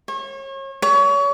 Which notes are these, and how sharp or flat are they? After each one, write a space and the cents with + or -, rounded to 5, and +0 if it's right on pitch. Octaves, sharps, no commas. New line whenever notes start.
C#5 -35
C#5 +30